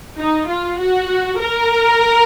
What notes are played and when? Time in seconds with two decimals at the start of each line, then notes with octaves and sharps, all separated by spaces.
0.17 D#4
0.47 F4
0.78 F#4
1.39 A#4